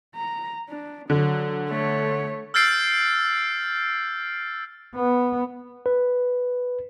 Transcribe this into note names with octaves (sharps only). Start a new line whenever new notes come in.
A#5
D4
D3 F#3
A3 C#5
E6 F6 G6 A6 C7 D7
B3
B4